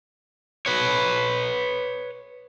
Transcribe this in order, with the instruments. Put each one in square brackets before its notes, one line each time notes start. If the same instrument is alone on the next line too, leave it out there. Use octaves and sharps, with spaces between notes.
[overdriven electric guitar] B4 C#5